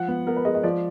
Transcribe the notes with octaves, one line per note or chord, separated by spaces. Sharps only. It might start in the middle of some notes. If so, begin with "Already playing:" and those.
Already playing: F3 F#5
B3
B3 A#4
B4
G#3 D#5
D#5
F3 D5